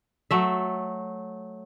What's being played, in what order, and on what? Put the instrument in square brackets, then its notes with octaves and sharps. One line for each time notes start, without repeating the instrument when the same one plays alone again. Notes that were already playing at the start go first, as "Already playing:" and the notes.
[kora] F#3 A3 E5